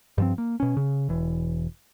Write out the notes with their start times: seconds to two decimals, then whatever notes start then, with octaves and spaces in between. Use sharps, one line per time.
0.18 G2 F3 C4
0.38 A#3
0.60 B2 C#4
0.77 C#3
1.09 E1 E3